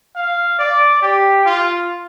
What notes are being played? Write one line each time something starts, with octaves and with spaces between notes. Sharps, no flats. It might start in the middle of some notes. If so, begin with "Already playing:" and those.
F5
D5
G4
F4